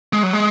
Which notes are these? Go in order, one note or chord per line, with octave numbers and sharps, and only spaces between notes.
G#3
F#3
G#3